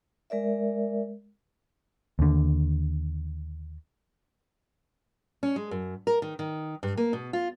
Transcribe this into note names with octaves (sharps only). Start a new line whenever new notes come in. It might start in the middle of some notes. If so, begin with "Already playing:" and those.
G#3 A#4 D5 E5
D#2 D3
C#4
G#3
F#2
A#4
D#3
D#3
G2
A#3
B2
F4